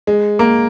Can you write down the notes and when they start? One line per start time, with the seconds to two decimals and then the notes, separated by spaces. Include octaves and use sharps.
0.07 G#3
0.39 A#3